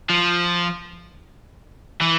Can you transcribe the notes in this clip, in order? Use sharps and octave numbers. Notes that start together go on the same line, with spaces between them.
F3
E3